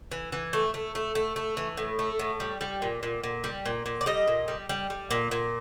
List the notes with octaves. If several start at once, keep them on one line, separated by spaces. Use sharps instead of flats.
E3
E3
A3
A3
A3
A3
A3
E3
A2
A3
A2
G3
G3
A#2
A#2
A#2
G3
A#2
A#2
D5
G3 D#5
A#2
G3
G3
G3
A#2
A#2